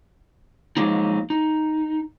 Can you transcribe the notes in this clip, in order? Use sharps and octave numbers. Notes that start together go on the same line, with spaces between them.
F3 F#3 G#3 A#3 D#4
D#4